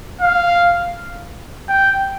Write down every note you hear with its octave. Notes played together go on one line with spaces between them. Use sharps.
F5
G5